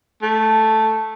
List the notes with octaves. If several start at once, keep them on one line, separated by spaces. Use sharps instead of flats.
A3